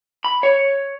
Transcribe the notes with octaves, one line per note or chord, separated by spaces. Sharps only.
B5
C#5